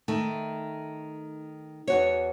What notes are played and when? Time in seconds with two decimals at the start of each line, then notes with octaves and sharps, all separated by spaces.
0.08 D#3 A3
1.87 E2 F#4 C#5